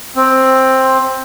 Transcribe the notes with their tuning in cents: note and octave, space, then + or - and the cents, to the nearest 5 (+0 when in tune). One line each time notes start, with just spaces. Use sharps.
C4 +10